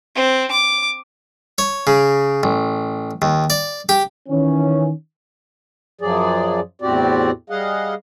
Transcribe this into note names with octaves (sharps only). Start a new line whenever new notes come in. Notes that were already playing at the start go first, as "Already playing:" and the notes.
C4
D6
C#5
C#3
A1
D#2
D5
G4
D#3 E3 C#4
F#2 F3 F#3 G#4 D5
E2 A2 C4 F#4 G4 D5
G3 G#4 D#5 F5 F#5